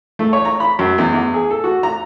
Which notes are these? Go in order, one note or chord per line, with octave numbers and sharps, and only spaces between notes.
A3
C#5
A#5
B5
F#2
E2
E2
G#4
A4
F#4
A#5